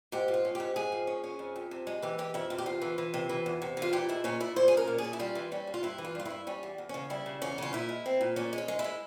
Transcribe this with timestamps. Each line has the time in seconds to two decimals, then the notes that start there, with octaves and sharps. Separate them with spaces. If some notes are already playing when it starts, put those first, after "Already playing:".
0.12 G#2 G4
0.28 F3
0.34 F4
0.45 C#4
0.55 G#2 G4
0.76 G#2 G#4
0.92 F3
1.07 C#4
1.24 C#4
1.39 F2
1.56 F2
1.71 C3
1.87 G#3
2.02 E3 G4
2.18 G#3 G4
2.34 F2 E4
2.50 C3 F4
2.58 G4
2.66 E2 F4
2.82 E3
2.98 E3
3.14 C3
3.29 E3
3.46 E2
3.62 C3
3.77 E3
3.82 F4
3.93 A#2 G4
4.09 G#3 E4
4.24 A#2 C#4
4.40 A#2 E4
4.56 A#2 C5
4.68 C#4 G#4
4.77 A#4
4.87 A#2
4.98 G#4
5.04 C#4
5.13 E4
5.19 G3 F4
5.35 E3
5.52 G3 C#4
5.67 G2
5.74 F4
5.83 G2 E4
5.98 E3
6.05 F4
6.15 G2 F4
6.25 G2 E4
6.47 G3 C#4
6.63 E2
6.78 E2
6.89 C#3 C#4
7.10 G3 E4
7.26 C#3
7.42 E2 C#4
7.58 C#3 F4
7.73 A#2 E4
7.89 G#3
8.06 C4
8.21 A#2
8.36 A#2 C#4
8.53 G#3
8.58 C#4
8.68 G#3
8.79 E4
8.84 G#3